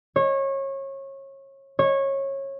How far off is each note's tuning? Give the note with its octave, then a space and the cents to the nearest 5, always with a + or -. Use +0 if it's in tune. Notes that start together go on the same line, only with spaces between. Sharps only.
C#5 -25
C#5 -20